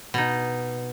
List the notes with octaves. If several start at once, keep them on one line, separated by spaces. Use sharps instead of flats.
B2 D#4